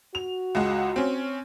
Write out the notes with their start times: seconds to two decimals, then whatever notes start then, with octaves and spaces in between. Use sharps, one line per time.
0.15 F#4 F7
0.55 C#2 G#3 F#5
0.96 C4 C#4